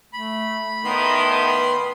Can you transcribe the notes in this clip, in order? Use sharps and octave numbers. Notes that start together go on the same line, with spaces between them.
A3 B5
A2 D#3 B3 B4 C6